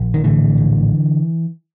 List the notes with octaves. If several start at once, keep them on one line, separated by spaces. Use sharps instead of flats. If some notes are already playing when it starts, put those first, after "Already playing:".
Already playing: A#1
D#3
A2 D3 E3
A#1